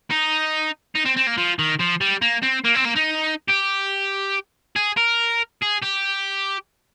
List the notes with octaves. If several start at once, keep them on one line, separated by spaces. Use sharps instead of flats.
D#4
D#4
C4
C4
A#3
F3
D#3
F3
G3
A#3
C4
A#3
C4
A#3
D#4
G4
G#4
A#4
G#4
G4